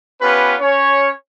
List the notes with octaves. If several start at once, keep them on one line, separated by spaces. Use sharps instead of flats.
B3 C#4 F4 G4 B4
C#4 C#5